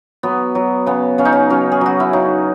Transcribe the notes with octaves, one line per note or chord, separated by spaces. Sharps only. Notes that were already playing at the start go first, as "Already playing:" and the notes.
F#3 B3
F#3
C#3 B3
C#3 C#4
D#4
C#4
F#3 C#4
G#4
F#3 F#4
E4
C#3 D#4